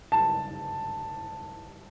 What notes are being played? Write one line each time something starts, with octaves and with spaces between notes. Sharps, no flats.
A5